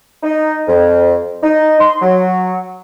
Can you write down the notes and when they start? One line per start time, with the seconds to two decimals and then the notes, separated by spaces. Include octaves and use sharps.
0.23 D#4
0.68 F2
1.43 D#4
1.80 C6
2.02 F#3